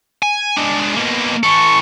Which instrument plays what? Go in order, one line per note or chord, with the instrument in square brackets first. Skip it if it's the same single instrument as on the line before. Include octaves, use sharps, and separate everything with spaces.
[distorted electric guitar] G#5
G#3 D4
B2 A#3
[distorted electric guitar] E3 A4 [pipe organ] C#6